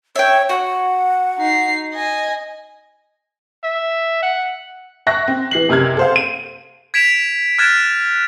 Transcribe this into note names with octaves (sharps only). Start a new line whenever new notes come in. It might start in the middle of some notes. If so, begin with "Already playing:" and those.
C#5 E5 G5
F#4 F#5
D#4 C7
D#5 G#5
E5
F#5
E5 C#6 F#6 A#6
C4
E3 C7 F#7
F#1 C3 A#4 F6 G#6
A4 C5 F5
D#7
G#6 B6 D7 E7 F7
F6 F#6 G#6 A6 D7 E7